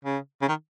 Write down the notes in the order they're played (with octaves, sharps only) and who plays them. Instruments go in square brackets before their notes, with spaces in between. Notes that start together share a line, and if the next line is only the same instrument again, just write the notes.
[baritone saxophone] C#3
C#3
D#3